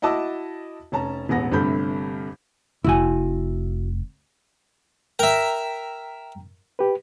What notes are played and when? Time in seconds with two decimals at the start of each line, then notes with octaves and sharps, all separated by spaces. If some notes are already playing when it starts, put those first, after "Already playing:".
0.02 E4 F#4 D#5 A5 D6 E6
0.92 F1 C#4 A5 A#5
1.29 E1 A1 B3 A#6
1.52 G1 G2 C3 A3 B5 G6
2.84 F1 E4 F#4 G#5
5.19 A#4 E5 G5 A#5
6.79 G4 B4